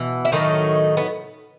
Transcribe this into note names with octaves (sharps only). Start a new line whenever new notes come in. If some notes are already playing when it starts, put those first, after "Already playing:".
Already playing: B2 E3
E4
A2 D#3 F#3 A3 D#4
B3